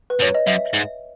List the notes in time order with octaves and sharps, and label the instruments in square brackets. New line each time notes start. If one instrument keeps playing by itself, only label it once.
[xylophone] B4
[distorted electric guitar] F#2 [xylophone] C#5
[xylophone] D#5
[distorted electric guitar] F#2 [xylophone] E5
[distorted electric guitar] G#2